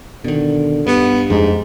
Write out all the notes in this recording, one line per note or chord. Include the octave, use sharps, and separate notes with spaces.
B2 D3 D#3
G2 B3
F2 G#2 G#3